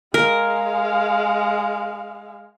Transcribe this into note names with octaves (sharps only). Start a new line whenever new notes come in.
G#3 A#4 F5